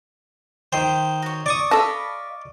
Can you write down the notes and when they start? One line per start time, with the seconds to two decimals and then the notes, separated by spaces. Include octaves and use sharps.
0.73 D#3 C5 G5
1.22 F#4 C#5
1.46 D5 C#6 D#6
1.71 A4 D#5 F5 A5 B5